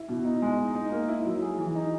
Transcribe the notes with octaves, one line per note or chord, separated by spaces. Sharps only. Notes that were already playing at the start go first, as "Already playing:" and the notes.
Already playing: E4
B2
D#4
G#3
D#4
D#4
A#3
E4
F#3
G#4
E3
D#4